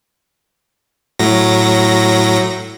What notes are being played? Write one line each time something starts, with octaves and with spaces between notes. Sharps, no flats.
A2 F#3 A#6